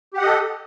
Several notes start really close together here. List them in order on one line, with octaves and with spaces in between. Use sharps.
G4 F#5 D#5 A4